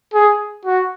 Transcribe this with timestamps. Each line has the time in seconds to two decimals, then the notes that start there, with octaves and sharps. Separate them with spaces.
0.14 G#4
0.65 F#4